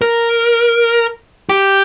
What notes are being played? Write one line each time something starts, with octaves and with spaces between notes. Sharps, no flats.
A#4
G4